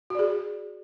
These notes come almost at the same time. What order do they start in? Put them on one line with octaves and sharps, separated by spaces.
F#4 D5 G#4